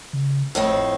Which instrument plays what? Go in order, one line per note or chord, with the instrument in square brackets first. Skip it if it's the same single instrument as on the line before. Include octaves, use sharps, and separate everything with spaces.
[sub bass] C#3
[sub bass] G#1 [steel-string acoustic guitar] F2 A2 C4